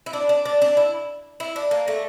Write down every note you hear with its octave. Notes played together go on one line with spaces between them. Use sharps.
E4
D4
D4
D4
D4
E4
E4
D4
A#3
A3